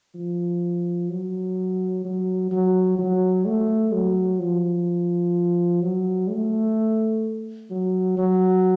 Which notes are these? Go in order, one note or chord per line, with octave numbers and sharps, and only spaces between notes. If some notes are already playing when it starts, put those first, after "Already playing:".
F3
F#3
F#3
F#3
F#3
A3
F#3
F3
F#3
A3
F#3
F#3